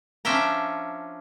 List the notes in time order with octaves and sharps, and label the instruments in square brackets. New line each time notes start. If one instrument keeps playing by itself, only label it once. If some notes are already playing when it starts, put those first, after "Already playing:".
[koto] F3 C#4 D4 E5 G5 A#5